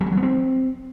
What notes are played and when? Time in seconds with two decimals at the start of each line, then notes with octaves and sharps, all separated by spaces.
0.01 F#3
0.06 G3
0.12 F#3
0.17 B3
0.23 C4